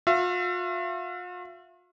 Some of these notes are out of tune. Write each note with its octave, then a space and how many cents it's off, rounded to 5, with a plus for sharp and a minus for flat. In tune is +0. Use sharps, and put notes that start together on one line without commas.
F4 +45 E5 +40